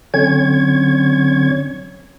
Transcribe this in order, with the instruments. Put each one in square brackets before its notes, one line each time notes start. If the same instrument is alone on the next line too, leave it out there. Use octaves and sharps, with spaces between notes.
[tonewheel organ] D3 F#3 C4 C#4 C#5 G#6